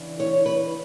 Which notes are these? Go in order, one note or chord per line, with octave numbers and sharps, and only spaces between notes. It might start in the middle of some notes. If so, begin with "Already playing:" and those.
Already playing: C#3 E3 B3 D4
C#5
B4